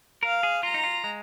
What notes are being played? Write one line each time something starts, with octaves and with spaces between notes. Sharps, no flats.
A#4 F5
G#4
F4 A#5
D#4
F4
G#3